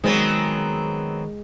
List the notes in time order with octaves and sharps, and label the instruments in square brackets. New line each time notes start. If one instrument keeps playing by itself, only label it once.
[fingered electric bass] D#3 [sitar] F#3 B3 C4 [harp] G#3